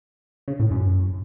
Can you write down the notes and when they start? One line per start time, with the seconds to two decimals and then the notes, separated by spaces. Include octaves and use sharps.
0.48 C#3
0.60 A2
0.71 F#2